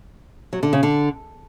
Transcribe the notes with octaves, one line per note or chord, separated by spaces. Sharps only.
F#3
D3
C#3
D3